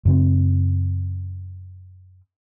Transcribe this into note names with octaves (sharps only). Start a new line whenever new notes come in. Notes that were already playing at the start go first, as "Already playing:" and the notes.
F#2 C#3 C4